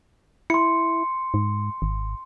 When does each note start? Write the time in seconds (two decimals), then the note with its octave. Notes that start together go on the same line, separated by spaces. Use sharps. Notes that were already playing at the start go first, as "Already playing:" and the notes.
0.50 E4 C6 C#7
1.34 G#2
1.82 G#1